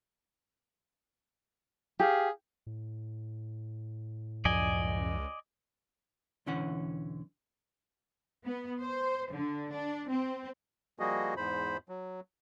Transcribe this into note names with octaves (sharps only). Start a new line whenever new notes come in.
G4 G#4 F5
A2
C#2 F#2 F3 D5 D#5 G#5
B1 E2 D3 E3 C#4 F#5
B3
C5
D3
D4
C4
F3 G3 A#3 F#4 G#4 D#5
E2 G#2 C5 B5
F#3